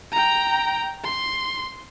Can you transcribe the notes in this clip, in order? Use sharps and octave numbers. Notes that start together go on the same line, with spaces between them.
G5 A#5
C6